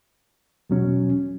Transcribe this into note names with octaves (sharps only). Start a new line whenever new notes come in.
E2 B2 F#3 C#4